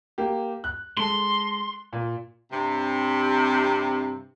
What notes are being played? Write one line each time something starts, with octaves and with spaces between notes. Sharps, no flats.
A#3 G4
F#6
G#3 A4 C6
A#2
G2 C3